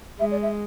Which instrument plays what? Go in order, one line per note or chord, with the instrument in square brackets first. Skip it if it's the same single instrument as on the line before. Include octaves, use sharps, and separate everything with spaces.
[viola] G#3 [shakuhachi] E5
[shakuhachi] D5
E5